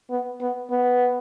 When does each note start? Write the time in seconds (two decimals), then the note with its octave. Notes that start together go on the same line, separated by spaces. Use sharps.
0.10 B3
0.41 B3
0.71 B3